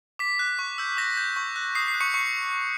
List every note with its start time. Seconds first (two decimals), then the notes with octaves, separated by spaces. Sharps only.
0.19 D6 B6
0.39 F#6
0.59 C#6
0.78 E6 G6
0.97 D6 A#6
1.17 G6
1.36 C#6
1.56 F#6
1.75 D#6 C7
1.88 C7
1.94 F#6
2.00 C#6 C#7
2.14 C#6 C#7